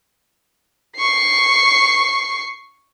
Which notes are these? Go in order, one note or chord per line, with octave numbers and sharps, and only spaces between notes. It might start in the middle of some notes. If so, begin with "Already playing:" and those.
C#6 C7